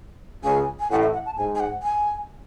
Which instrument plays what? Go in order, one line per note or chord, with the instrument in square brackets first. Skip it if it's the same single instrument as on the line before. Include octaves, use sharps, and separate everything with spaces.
[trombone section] C#2 C#3 [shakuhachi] G#5
[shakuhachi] G#5
[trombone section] A1 A2 [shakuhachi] F#5
[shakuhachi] E5
F#5
A5
[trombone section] G#2 [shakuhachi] G#5
[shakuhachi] G#5
F#5
G#5